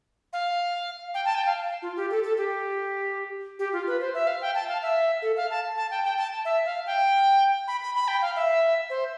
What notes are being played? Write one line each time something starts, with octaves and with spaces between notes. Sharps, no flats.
F5
G5
A5
G5
F5
F4
G4
A4
A4
G4
G4
F4
B4
C5
E5
F5
G5
A5
F5
E5
A4
F5
A5
A5
G5
G5
A5
E5
F5
G5
B5
B5
B5
G5
F5
E5
C5